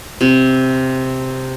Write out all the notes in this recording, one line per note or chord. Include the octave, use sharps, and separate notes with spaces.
C3